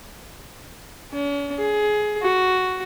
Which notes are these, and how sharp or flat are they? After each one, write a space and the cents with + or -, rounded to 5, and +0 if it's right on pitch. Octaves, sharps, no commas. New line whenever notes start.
C#4 +45
G#4 +20
F#4 +5